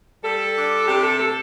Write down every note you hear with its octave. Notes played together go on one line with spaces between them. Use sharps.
G3 A4
D4
C3 G4
A4
A4